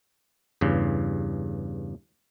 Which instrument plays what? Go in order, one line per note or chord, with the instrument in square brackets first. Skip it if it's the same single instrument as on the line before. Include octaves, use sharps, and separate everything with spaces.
[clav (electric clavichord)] E2 G2 C#3